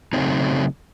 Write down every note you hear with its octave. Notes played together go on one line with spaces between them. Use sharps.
C#3 F3 F#3 A3 C4 D#4